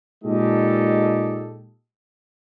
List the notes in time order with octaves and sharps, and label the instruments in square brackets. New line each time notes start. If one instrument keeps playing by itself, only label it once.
[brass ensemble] A#2 G#3 D#4 G4 A4 D#5